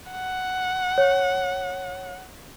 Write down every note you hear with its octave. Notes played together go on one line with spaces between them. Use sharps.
F#5
C#5